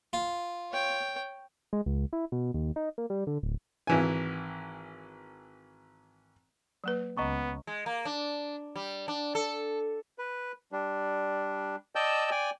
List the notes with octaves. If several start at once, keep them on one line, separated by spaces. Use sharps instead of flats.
F4
C#5 G5
G#3
C#2
E4
B2
D#2
D#4
A#3
G3
D3
D1
G#1 E3 G#5
F#3 A#3 B4
C#2 B3 D#5 A#5 C#6
G#3
A#3
D4
G3
D4
A4
B4
G3 D4
D5 D#5 G5 A5 E6 G6
D5 G5 G#5